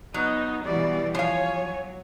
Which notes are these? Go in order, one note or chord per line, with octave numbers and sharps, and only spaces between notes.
F#3 B3 D#4
B2 E3 G3 D5
F3 C#5 F5 G#5
F#3